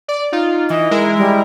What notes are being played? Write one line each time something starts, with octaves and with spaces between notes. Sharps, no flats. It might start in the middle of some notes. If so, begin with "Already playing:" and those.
D5
D#4 F4
E3 D#5
G#3 E4 A#4
G3